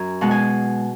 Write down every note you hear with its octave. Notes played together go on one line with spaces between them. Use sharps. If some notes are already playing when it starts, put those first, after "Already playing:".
Already playing: F#2 G#5 A#5
B2 G#3 F#5
G#5